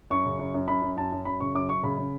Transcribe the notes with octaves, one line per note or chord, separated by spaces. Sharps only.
F#2 C#6
C#3
F#2
F#2
F#2 B5
F#2
F#2 A5
F#2
F#2 B5
C#3 C#6
F#2 D6
F#2 C#6
C#3 B5
C#3